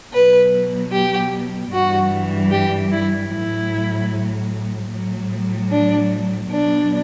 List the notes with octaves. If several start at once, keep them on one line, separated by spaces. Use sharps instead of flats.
B2 F#3 B4
G4
G2 E3 G3 F#4
G4
E4
A2 F#3 E4
A2 F#3
D4
B2 F#3 D4